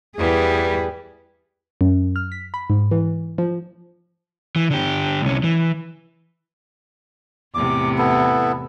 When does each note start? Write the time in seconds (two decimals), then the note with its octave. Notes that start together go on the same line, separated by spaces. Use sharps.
0.17 E2 G3 G#4 B4
1.81 F#2
2.16 F6
2.32 B6
2.54 B5
2.70 G#2
2.91 E3
3.38 F3
4.56 E3
4.71 D3 G4
5.22 C2 C#4
5.44 E3
7.55 E2 A2 C3 D6
7.98 B3 E4 A4